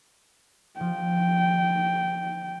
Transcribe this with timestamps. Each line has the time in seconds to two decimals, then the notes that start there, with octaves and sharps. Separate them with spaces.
0.80 F3 G5